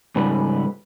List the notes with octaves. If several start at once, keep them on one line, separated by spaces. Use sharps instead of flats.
G#2 C#3 G3 B4